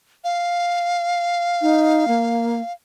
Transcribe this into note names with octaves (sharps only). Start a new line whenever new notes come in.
F5
D#4
A#3